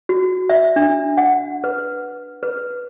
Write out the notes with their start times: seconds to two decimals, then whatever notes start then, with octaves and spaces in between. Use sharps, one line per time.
0.09 F#4
0.49 E5
0.76 D4
1.17 F#5
1.64 B4
2.43 B4